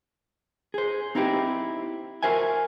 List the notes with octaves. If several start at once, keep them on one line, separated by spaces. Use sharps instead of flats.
G#4 C5
C4 D#4 E4 G4
F#4 A#4 C5 E5 G#5